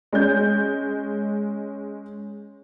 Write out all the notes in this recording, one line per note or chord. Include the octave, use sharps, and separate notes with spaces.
G#3 C#4 G6